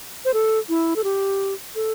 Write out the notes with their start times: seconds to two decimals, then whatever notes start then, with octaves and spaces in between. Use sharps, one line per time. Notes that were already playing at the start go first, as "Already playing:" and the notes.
0.25 C5
0.34 A4
0.69 E4
0.96 A4
1.04 G4
1.75 A4